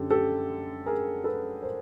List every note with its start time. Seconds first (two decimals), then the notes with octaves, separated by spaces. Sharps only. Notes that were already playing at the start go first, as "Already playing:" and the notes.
Already playing: F#2 D3 G4 A4
0.10 G4 A4
0.86 G#4 A#4
1.24 A4 B4
1.63 A#4 C5